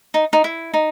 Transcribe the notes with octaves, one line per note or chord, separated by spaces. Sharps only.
D#4
D#4
E4
D#4